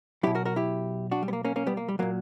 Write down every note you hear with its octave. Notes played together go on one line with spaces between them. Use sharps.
B2 F#3 E4 G4
F#4 A#4
F#4 A#4
E4 G4
D4 F#4
G3
B3
A#3
A#3 C#4
A#3 C#4
G3 B3
A#3
G3
A#2 F#3 A#3